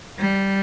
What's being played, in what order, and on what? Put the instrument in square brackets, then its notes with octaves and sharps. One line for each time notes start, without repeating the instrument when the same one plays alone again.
[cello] G3